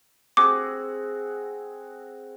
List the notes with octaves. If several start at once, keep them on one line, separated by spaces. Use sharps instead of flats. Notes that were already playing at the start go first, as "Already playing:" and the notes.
C4 F#4 G#4 D6